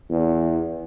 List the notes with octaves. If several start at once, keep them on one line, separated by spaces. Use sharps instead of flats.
E2